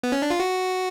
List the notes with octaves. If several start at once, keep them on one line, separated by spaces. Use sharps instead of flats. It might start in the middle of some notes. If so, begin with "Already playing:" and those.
B3
C#4
D4
F4
F#4